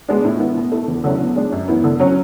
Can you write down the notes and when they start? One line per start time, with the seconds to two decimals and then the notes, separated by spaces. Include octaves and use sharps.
0.09 G#3 B3 D4
0.25 A2
0.40 E3 B3
0.57 B2
0.72 A3 E4
0.88 E2
1.04 D3 F#3 C#4 E4
1.20 B2
1.36 G#3 D4
1.52 F#2
1.68 E3 B3 E4
1.84 D3
2.00 F#3 C#4